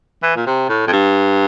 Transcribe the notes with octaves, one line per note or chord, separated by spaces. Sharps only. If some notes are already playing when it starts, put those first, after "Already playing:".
E3
A#2
C3
A2
F2
G2